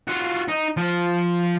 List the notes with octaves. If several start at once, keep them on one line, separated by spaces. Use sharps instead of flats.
F4 F#4
D#4
F3